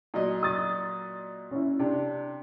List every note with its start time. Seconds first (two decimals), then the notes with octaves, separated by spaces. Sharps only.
0.14 A#2 F#3 D#5
0.43 D#6 A6
1.51 C#4 E4
1.79 C3 D4